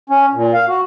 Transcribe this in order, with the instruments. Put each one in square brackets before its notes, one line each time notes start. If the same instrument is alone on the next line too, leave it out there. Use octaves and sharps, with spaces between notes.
[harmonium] C#4
A#2
F5
F#4